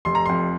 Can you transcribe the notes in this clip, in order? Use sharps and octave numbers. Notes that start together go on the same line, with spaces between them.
F1 C6
A#5
F2 C6